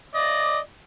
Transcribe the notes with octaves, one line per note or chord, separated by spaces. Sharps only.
D5 D#5